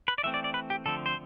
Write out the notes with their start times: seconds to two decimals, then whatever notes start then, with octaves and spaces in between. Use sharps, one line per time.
0.08 B4
0.18 D5
0.23 E3 A3 C4 E5
0.34 D5
0.44 D5
0.54 B4
0.70 G4
0.86 D3 F3 A3 C4 A4
1.06 C5